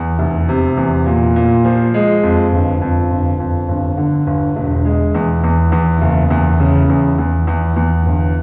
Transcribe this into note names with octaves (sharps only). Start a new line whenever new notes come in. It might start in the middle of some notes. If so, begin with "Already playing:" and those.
Already playing: E2
F1
C3
E2
A#2
A#2
F3
G#3
F2
G1
F2
G1
F2
G1
D3
G1
E1
G#3
E2
E2
E2
F#1
E2
C#3
E2
E2
E2
E2
G1